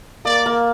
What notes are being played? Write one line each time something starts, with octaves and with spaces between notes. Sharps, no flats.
A#3 D5
A#3